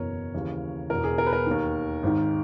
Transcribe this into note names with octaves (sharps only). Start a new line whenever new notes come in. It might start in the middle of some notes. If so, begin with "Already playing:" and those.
Already playing: F#1 E2 B2 A#4 C#5
D#2 C#3 E3
E1 E2 B2 A#4
G#4
A#4
B4
A#4
D#2 D#3
G#1 G#2 D#3